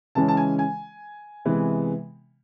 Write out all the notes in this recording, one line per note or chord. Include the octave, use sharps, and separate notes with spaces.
C#3 E3 G#3 C#4 A5
A5
G#5
G#5
C3 E3 G#3 B3